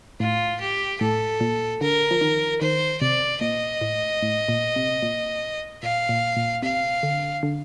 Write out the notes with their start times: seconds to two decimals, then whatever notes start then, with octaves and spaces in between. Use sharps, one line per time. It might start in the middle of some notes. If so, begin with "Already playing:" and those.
0.20 A2 F4
0.60 G4
1.01 A2 A4
1.40 A#2
1.81 D3 A#4
2.11 F3
2.21 D#3
2.61 D#3 C5
3.01 C3 D5
3.41 A#2 D#5
3.81 A2
4.23 A2
4.49 A#2
4.76 C3
5.03 A#2
5.83 A#2 F5
6.09 A#2
6.37 A#2
6.62 C3 F5
7.03 D3
7.43 D3